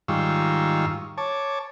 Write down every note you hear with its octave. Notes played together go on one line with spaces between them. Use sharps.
G#2 D#3 G3 F4 C#6 E6
C#5 A5 D6